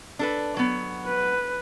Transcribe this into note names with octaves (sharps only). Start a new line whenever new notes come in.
D4 A4 B4
F#3 B3
B4